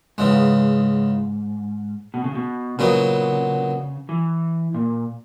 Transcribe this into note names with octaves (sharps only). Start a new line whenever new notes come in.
E2 G#2 C#3 G#3
B2
C#3
B2
A#2 C#3 F#3 B3 D#4
E3
A#2